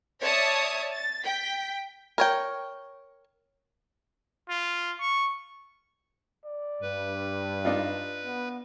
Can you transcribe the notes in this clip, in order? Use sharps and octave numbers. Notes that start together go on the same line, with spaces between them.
C#5 D5 E5 A5 D#6
A6
G5 B6
A#4 C#5 G5
F4
C#6
D5
G2 B4
D4 D#4 F4
B3